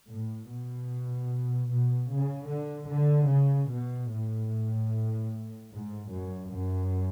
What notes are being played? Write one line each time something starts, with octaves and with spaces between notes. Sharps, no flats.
A2
B2
B2
C#3
D3
D3
C#3
B2
A2
G#2
F#2
F#2